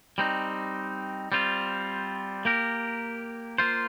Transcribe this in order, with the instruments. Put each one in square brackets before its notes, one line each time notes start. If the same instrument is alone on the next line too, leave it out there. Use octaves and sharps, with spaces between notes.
[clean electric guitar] G3 C4 D#4
G3 C4 F4
A#3 G4 A#4
A#3 F4 C5